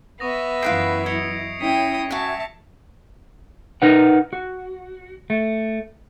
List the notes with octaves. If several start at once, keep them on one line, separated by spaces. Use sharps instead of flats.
B3 E5 C#6 D#6 A#6
F#2 E3 E4 F4 B4 G5 C7 D7
D#5 G#6 C#7 F7
C#4 E4 G5 D#6 B6
F#4 E5 G#5 A5
D#4 A#4 B4 F#5
F#4
A3